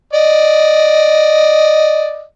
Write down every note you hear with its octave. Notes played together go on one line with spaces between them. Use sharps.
D5 D#5